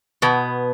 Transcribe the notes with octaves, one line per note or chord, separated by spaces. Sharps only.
B2 B3